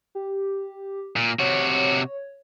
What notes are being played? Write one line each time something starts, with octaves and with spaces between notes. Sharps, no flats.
G4
A#2
C3 F#4 C#5